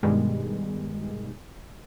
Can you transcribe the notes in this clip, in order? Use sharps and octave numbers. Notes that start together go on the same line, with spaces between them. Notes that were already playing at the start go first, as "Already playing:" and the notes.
G2 B2 D#3 G3 G#3